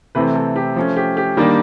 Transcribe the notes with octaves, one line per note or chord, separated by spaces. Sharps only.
C3 E3 A3 C4 B4
A4
G4
F3 A3 C#4
G4
G4
D#3 G3 A#3 D4